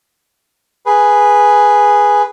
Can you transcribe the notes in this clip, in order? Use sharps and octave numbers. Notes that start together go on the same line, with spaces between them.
G#4 B4